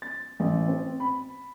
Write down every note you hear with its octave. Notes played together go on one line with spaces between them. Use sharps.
A6
A1
C4
B5